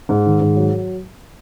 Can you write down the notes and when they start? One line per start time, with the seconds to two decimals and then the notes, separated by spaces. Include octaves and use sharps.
0.09 G#2
0.26 D#3
0.41 G#2
0.56 F#3